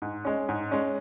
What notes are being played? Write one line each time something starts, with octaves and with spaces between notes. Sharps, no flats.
G#2
G#3 C#4
G#2
G#3 C#4